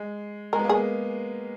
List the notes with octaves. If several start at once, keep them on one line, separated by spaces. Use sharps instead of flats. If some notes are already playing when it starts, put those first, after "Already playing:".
Already playing: G#3
G#3 A#4
B3
A#3
G#4
G#3